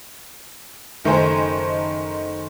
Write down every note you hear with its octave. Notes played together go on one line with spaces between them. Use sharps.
F#1 D#3 A3 D#4 C5 G#5